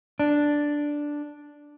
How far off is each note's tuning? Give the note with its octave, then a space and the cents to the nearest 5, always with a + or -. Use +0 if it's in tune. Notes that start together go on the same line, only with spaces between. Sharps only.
D4 +0